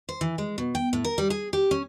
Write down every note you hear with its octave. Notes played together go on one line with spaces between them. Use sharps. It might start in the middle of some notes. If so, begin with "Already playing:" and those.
C5
E3
G#3
B2
G5
A2
A#4
G3
G#4
G4
C#4